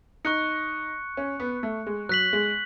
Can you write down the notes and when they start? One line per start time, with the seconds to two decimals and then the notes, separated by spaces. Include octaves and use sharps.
0.25 D#4 C#6 F#6 C#7
1.17 C#4
1.40 B3
1.63 A3
1.87 G#3
2.09 F#3 F#6 B6 F#7
2.33 G#3